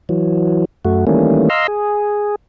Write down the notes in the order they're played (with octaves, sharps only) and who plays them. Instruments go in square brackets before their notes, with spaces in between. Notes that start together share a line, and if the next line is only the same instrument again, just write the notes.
[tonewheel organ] E3 F#3
F#2 A3 F#4
D#3 E3 G3 A3 A#3 C#4
D#5 F5 A#5 C6 E6
G#4